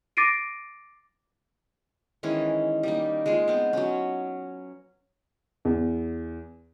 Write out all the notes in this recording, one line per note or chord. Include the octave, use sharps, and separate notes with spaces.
D6 A6 A#6 C7 D7 D#7
D#3 E3 G#3 C#4
G3 A#3 D#4
G#3 A#3 F4
B3 C4
F#3 C#4
E2